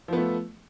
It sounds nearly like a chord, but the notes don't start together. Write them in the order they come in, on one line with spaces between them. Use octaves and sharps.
F3 B3 A3